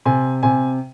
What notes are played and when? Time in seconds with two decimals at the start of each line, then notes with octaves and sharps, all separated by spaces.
0.06 C3 G#5
0.43 C3 G#5